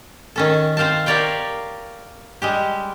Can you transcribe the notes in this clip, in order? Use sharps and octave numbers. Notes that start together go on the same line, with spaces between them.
D#3 C#4 A4
C4 C5 F5 G5 A5
G4 A#4 C#5 D5 F5 G5
G3 G#3 G4